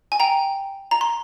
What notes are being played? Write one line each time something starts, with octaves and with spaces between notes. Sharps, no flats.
G#5
G5 A#5
A#5
C6